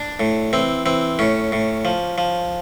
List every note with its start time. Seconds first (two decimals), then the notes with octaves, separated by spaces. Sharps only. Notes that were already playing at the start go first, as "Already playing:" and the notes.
Already playing: D4
0.20 A2
0.53 E3 C4
0.86 E3 C4
1.19 A2 C#4
1.52 A2
1.85 F3
2.18 F3